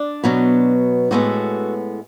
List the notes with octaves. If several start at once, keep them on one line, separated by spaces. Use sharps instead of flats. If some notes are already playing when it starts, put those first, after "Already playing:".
Already playing: D4
B2 F#3 B3
A2 G#3 B3 F#4 A4